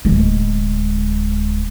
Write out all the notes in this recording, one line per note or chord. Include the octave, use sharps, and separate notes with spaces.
D1 G#3